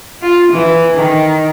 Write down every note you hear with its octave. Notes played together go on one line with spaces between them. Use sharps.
F4
E3
D#3